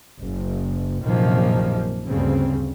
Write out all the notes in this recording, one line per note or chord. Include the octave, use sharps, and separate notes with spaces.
F#1
A#1 F#2 C3 D#3 F3 A#3
D2 G2 C#3 C4